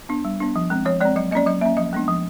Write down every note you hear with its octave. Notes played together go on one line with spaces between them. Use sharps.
B3 D4
G3
B3 D4
F3
G#3 C4
F3 C#5
G#3 C4 D5
F#3 D#5
A#3 C#4 D5 D#5
F#3 D#5
A#3 C#4 E5
F3 D#5
G#3 B3 D4
F3